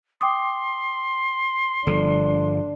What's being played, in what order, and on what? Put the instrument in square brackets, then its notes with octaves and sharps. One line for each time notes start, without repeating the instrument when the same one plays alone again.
[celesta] G5 D6 D#6 [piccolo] C6
[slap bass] G1 F3 [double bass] D4 [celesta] A4